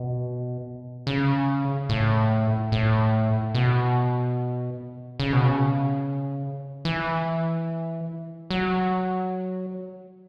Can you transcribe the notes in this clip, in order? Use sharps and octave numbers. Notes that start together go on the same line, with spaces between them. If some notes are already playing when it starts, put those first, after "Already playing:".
Already playing: B2
C#3
A2
A2
B2
C#3
B2
C#3
E3
F#3